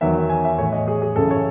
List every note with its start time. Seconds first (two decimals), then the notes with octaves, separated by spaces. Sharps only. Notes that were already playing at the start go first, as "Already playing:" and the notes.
0.01 E2 D#3 F#3 E5
0.30 G#5
0.45 E5
0.58 A2 E3 C#5
0.73 D#5
0.88 G#4
1.02 G#4
1.16 F#2 C#3 E3 A4
1.31 C#5